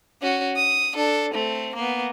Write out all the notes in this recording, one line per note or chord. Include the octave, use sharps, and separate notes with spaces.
C#4 F#4
D#6
D4 A4
A3 C4
A#3 B3